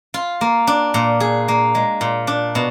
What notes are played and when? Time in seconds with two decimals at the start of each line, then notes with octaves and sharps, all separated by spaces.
0.14 F4
0.41 A#3
0.67 D4
0.94 A#2
1.20 G#4
1.48 A#3
1.75 G#3
2.01 A#2
2.27 D4
2.55 B2